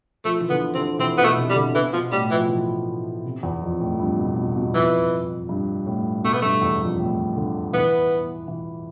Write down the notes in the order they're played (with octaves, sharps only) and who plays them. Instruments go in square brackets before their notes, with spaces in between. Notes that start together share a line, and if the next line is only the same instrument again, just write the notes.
[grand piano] F3 [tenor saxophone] A3
[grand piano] E3
[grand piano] D3 [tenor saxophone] B3
[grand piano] D3 [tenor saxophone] C4
[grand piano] E3 [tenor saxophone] C4
[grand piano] B2 [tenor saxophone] B3
[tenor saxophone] A3
[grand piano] C3
[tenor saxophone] G3
[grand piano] D3
[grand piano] D3 [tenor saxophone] E3
[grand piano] B2 [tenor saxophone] F3
[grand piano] A2 [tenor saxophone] G3
[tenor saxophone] E3 [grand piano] F3
[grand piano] E3
C3
E2
F2
A2
F2
G2
B2
B2
B2
[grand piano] F2 [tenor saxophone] E3
[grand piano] G2
A2
[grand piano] B2 [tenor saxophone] A3
[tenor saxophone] B3
[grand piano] G2 [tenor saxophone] A3
[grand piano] E2
F2
A2
D3
[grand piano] E3 [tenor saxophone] B3
[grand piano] E3